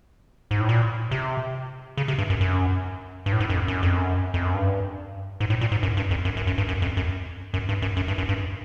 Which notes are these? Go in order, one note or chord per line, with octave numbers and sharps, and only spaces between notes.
G#2
A2
A#2
C3
C#3
C3
G2
F#2
F#2
G2
A2
G#2
F#2
F2
F#2
F2
F#2
F2
F#2
G2
G#2
A2
A#2
G#2
F#2
G2
F2
F#2
F#2
F#2
G2
F#2
F2
F#2
F#2
G2
F#2
F#2
G2
F#2
G2